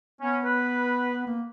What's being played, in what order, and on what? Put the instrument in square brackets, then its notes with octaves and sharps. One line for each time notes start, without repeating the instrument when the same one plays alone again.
[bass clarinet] B3 [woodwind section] C#4
[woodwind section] B4
[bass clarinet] A#3